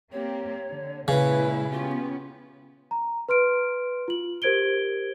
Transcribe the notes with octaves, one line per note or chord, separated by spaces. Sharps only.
A#3 C4 G4 C#5
D3
A#2 C#3 G#3 E4 B4
B3 C#4 F4 G4
A#5
B4 C6 F6 D7
F4 F#7
G4 A#4 C5 G#6 D7 G7